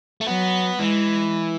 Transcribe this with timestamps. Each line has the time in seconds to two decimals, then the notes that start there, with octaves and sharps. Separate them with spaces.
0.21 A3
0.26 F#3 B3
0.79 E3 G#3